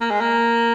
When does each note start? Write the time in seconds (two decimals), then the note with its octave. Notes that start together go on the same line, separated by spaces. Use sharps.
0.01 A#3
0.11 G#3
0.21 A#3